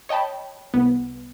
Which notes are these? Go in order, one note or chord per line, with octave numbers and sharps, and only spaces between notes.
C#5 D#5 G5 A5 B5
C2 B3